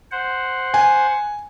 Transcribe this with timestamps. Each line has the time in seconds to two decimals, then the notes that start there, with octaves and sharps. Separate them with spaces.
0.11 C5 F#5
0.74 G#5